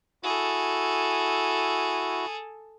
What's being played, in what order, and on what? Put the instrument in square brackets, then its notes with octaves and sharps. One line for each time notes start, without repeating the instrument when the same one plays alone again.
[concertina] E4 F#4 [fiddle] G#4 A4